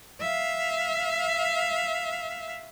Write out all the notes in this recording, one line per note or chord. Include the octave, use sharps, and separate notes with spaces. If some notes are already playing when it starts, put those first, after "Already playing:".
E5 F5